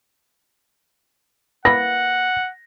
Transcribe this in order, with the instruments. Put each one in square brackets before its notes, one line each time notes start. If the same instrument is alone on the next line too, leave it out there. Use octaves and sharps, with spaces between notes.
[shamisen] A#3 E4 B4 [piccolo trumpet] F#5 [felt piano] A#6